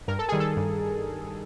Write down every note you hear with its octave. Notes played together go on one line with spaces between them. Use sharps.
G2 A#4
A4
D#3 G3 G#4
A4
G2